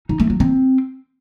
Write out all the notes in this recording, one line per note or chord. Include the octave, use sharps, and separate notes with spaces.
D#4
A3
F#3
C4